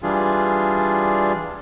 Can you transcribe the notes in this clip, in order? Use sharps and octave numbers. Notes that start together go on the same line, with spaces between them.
E3 G3 D4 F4 G#4